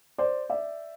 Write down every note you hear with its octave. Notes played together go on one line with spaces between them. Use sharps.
C5 D5
D5 E5